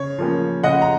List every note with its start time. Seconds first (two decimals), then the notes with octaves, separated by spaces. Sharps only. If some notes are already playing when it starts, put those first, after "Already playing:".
Already playing: C#3 C#5
0.18 F3 A#3 C#4
0.64 C#3 D#5 F#5
0.82 A#5